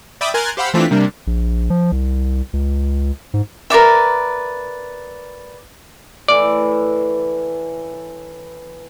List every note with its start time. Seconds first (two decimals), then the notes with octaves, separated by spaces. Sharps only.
0.21 D5 E5 G5 B5 D6 D#6
0.34 A#4 G#5 C6 F#6 G#6 A6
0.57 G4 C5 F5 F#5 B5 E6
0.74 E3 A3 C4 D4 F4 B6
0.91 C3 G3 A#3 D4
1.27 A#1
1.70 F3
1.92 C2
2.53 C#2
3.34 G#2
3.70 A#4 B4 D5 E5
6.28 A2 E3 D5